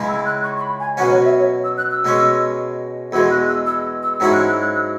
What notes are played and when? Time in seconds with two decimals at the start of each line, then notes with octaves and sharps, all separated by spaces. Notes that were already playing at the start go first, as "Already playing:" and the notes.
Already playing: C#2 C#3 G#3 E4
0.08 E6
0.26 F#6
0.44 C#6
0.57 C#6
0.61 B5
0.80 G#5
0.97 B2 F#3 C#4 F#5
1.11 C#5
1.24 E5
1.38 C#5
1.64 E6
1.77 F#6
1.91 E6
2.05 B2 G#3 C#4
3.12 E2 B2 G#3 E6
3.30 F#6
3.49 E6
3.66 E6
4.02 E6
4.19 G#2 F#3 C#4 E4 E6
4.33 F#6
4.47 E6
4.61 F#6
4.74 E6